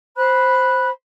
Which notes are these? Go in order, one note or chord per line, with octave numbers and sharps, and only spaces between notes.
C5 B5 F#6